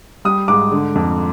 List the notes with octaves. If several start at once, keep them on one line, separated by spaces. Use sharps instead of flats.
G3 D#6
G#2 D6
D3
F2